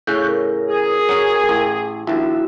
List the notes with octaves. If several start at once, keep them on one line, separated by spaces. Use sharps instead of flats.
A2 C#3 C#4 C#6 F#6 G6
A#4
G#4
F#3 C#4
A1
A#1 D#2 E4 F#4 E5